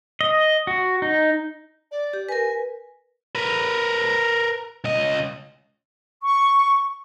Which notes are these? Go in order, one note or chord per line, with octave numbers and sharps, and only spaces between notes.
D#5
F#4
D#4
D5
G4
A#4 B4 G#5
A#4 B4
C#2 D#5
C#6